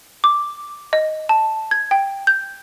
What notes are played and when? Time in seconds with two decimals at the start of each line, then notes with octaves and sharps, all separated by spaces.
0.24 D6
0.93 D#5
1.29 A5
1.71 G#6
1.91 G5
2.27 G6